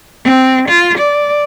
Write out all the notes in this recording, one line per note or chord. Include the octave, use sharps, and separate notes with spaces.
C4
F4
D5